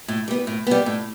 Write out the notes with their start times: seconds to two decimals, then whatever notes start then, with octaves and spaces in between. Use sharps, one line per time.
0.08 A2
0.28 G3 B3
0.47 A2
0.67 G3 B3
0.86 A2